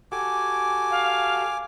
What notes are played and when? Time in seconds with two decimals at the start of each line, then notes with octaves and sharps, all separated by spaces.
0.12 F#4 G4 A4 G#5 D6
0.91 F5